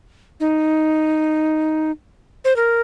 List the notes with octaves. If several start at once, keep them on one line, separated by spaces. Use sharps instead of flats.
D#4
C5
A#4